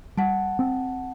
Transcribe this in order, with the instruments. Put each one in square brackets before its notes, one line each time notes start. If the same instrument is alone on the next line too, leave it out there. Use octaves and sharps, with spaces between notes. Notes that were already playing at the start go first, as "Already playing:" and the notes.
[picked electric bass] G3 [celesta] F#5 A5
[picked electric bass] C4